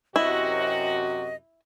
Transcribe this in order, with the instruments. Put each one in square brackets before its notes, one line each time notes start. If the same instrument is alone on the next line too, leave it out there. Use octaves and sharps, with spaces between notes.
[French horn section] F#2 C3 F#4 [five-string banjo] E4 [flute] D#5